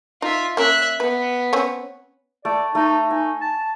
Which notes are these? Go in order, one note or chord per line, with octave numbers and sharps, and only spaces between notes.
D#4 F4 E5
A#3 C#4 A#4 E5 F#6
B3 B4
C4 C#4 C#5
A3 D5
A3 D#4
D#4 G#5
A5